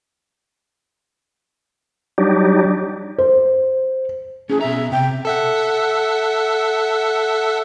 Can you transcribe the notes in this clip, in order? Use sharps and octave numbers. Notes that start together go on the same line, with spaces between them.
F#3 G3 D4 D#4 G4
C5
C#4 E4 G#4
B2 E5 A#5
C3 G5
A4 E5 F#5